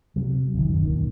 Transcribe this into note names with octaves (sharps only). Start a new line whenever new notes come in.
C3 F#3
E1 B1 D#3
F#2 D#3
D#2 A#2 D#3